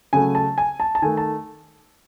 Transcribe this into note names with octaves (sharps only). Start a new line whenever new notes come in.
C#3 F#3 A3 G#5
A5
G#5
A5
A5
D#3 A3 G#5
A5